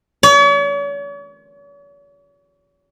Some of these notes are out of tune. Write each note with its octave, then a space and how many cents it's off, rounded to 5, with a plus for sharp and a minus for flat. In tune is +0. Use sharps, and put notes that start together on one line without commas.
C#5 +45